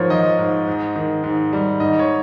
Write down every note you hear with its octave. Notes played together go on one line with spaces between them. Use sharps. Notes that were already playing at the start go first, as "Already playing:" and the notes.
Already playing: G#2 F3 A#4 C5 C#5
F3 D#5
G#2
G#2
D#3
G#2
G3
G#2 D#5
C#5